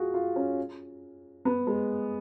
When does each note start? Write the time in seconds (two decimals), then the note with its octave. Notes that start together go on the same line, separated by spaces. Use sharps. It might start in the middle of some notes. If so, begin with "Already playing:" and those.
Already playing: F4 F#4 G#4
0.14 F4
0.36 C#4
1.45 B3
1.67 G#3